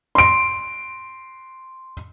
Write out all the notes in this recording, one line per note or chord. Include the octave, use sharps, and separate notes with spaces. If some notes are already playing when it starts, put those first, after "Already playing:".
C6 D7